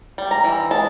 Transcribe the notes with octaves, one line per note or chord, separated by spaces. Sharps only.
G3
A#5
E3
G#3 A5